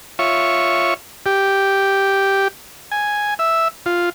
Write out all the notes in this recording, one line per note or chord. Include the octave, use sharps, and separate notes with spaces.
F4 C#5 E5 C#6
G4
G#5
E5
F4